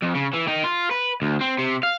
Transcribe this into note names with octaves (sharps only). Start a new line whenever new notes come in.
F2
C#3
E3
D#3
F4
B4
D2
C4
C3
F5